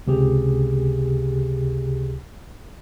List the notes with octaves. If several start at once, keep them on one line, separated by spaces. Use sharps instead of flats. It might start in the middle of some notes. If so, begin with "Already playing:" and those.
C#2 C3 G4 G#4